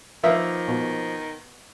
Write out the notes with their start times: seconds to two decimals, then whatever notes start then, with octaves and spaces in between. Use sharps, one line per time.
0.23 D#3 F3 A#3 B4 E5 F5
0.68 B2